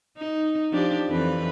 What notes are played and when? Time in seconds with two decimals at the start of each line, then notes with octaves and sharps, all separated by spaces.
0.18 D#4
0.72 F3 D4 G4
1.08 F2 E3 B4